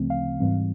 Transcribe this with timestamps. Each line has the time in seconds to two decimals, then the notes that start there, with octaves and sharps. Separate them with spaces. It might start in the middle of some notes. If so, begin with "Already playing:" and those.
Already playing: D2 C#3 F3 A3 C4
0.10 F5
0.40 G#2 E3 G3 C4